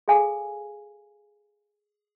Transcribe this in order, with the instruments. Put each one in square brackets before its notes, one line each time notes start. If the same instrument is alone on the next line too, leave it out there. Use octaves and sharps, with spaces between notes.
[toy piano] G#4 A4 F5 G#5